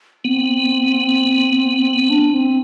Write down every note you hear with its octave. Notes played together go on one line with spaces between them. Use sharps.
B3 C4
D4
C4